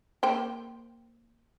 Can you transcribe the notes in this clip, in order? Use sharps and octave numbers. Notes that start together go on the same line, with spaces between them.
A#3 C5 G5